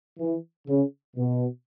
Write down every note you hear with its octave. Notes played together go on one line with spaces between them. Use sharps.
E3
C#3
B2